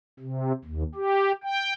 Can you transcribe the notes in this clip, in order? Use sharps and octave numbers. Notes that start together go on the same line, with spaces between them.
C3
D#2
G4
G5